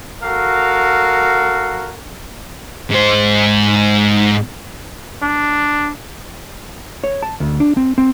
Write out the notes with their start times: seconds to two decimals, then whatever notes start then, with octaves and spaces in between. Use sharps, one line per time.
0.22 F#4 A4 A#4 F5
2.90 G#2 C5
5.22 D4
7.04 C#5
7.23 A5
7.40 D2
7.60 D4
7.77 C4
7.98 C4